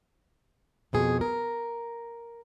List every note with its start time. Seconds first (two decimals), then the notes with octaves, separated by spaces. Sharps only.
0.93 F2 B2 G#4
1.21 A#4